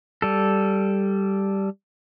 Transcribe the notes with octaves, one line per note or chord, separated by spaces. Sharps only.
G3 A4